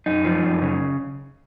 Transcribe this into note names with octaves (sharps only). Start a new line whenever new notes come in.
F#2 D#4
F3
F#2
C#3